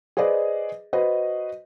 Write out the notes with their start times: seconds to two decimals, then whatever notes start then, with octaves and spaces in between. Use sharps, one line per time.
0.17 G#4 B4 C5 D5 D#5
0.93 F#4 B4 C5 D#5